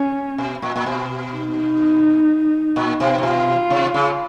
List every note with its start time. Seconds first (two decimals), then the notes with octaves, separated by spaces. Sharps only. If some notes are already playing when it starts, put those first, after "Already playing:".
Already playing: C#4
0.38 B2
0.62 A#2
0.76 A#2
0.86 B2
1.34 D#4
2.76 A#2
3.00 B2
3.18 C3
3.23 B2 F4
3.70 C3
3.94 C#3